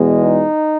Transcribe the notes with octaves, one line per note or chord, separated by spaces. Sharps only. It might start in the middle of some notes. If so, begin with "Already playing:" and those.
Already playing: E2 B2 G#3
D#4